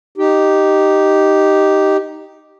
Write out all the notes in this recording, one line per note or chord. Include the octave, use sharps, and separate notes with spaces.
D#4 G4